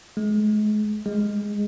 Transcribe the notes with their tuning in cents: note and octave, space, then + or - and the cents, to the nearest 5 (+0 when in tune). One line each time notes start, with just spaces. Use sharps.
G#3 +35
G#3 -10